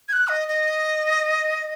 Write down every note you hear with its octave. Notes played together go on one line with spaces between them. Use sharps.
G#6
F#6
D#5
D#5